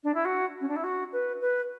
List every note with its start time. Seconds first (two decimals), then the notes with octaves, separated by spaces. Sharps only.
0.04 D4
0.14 E4
0.25 F#4
0.60 C#4
0.68 D4
0.76 E4
0.84 F#4
1.12 B4
1.41 B4